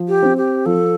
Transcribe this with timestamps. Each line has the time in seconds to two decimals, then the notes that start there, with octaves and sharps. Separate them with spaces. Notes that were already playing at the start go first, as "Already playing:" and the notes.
Already playing: F3
0.08 G4
0.23 C4
0.37 G4
0.66 F3 A4